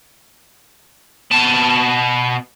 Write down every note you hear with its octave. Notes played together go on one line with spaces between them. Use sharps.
B2 A5